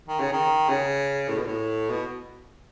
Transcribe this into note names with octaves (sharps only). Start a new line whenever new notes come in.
D#3
C#3
D#3
C#3
A2
B2
A2
B2